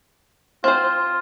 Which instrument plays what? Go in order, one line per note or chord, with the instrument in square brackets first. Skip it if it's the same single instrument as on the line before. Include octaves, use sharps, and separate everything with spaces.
[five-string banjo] C4 C5 [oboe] F4